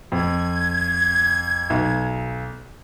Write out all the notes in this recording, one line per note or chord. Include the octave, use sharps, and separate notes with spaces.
F2 G#6
B1